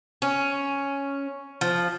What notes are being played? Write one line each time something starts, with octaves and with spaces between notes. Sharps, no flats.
C#4
F3